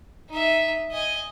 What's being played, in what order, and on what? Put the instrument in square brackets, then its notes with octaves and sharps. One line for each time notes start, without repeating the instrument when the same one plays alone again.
[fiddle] D#4 E5
D#5 G#5